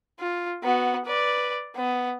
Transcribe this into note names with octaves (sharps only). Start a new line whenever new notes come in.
F4
B3 F#4
B4 D5
B3